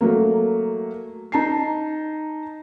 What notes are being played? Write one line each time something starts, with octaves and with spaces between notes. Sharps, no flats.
F#3 A3 A#3
D#4 A5 C7